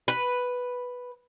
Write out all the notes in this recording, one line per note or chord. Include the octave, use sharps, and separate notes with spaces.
B4